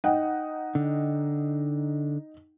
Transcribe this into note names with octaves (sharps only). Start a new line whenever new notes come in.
D#4 F#5 G5
D3